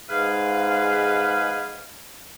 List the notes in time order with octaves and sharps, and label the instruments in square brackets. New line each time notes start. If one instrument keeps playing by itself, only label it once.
[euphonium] G#2 [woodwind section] G#4 B4 F5